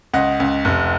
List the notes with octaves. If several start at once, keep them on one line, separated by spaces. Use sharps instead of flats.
C#2 D#5 F#5
C#2
F1